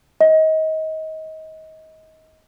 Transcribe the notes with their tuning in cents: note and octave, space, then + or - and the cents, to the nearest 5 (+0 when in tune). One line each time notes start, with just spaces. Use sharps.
D#5 +25